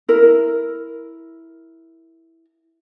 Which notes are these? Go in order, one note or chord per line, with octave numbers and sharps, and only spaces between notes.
E4 A#4